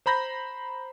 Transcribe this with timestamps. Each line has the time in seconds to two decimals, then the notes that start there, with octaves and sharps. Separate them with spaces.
0.06 C5 A#5 B5 G6 A#6